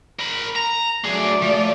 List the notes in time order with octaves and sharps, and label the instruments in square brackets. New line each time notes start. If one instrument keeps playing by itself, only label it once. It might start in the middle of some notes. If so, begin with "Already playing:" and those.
[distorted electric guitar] A#4 B5
A#5
[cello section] F#3 A3 D5 [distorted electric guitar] D4 G#4
[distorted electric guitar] F3